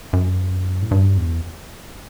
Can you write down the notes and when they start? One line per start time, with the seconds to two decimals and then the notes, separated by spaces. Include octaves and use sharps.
0.13 F#2
0.82 A2
0.91 G2
1.17 E2